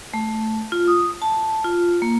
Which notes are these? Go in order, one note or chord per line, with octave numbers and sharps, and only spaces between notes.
A3
F4
D#6
A5
F4
A#3